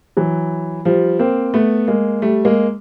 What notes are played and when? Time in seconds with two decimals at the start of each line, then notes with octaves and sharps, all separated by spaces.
0.17 E3 F#3
0.85 F3 G3
1.19 A#3 C4
1.54 A3 B3
1.88 G#3 A#3
2.22 G3 A3
2.45 G#3 A#3